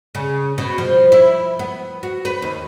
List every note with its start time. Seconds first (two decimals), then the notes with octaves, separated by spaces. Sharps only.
0.15 C#3
0.58 B2
0.78 F3
1.12 E4
1.59 B3
2.03 F#4
2.25 B4
2.42 D#2